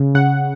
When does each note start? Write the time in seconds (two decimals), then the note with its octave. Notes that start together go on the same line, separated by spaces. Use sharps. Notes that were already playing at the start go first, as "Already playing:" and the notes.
Already playing: C#3
0.15 C#3 F#5